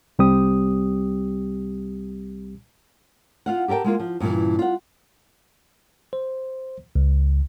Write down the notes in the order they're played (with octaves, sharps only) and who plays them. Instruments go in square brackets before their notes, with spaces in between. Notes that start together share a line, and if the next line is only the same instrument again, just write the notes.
[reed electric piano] C2 G3 C4 G4 D#6
[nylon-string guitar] F4 F5 F#5
G4 A4 A#4 G5 A5
G#3 A#3 F4
F3
G2 A#2 C#3 E3
F4 F#5
[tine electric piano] C5
C#2